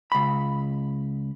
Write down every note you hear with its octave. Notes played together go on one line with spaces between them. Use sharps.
C#2 B5